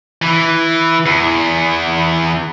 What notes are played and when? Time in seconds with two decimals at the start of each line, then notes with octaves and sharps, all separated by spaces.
0.22 E3
1.06 E2